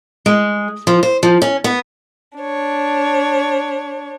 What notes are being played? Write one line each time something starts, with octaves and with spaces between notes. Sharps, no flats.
G#3
F3
C5
F3
C#4
B3
D4 C#5